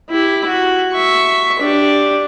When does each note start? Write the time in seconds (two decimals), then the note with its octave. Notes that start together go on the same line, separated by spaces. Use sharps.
0.10 E4 G4
0.46 F#4
0.93 E5 C#6
1.60 D4 G4